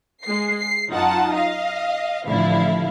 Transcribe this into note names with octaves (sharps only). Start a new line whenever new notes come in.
G#3 C7
C7
F#2 D#4 F4 F#5 A5
D#5 F5
A1 D3 F3 E4 F5